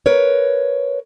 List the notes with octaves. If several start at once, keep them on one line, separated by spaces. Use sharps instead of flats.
A#4 B4 C#5